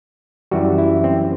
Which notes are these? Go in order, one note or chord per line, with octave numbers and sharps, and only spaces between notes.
F#2 E3 G3 F#4
E4
C4